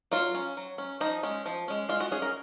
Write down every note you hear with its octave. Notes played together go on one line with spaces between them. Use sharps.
F#3 F4
C#4
F#3
C#4
F3 D#4
G#3 C#4
F3
G#3 C#4
G#3 F4
F#4
C#4 G#4
A#4